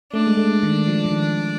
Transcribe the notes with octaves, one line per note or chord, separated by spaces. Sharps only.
A3 D4
G#3
A3
D#3
F3
D#3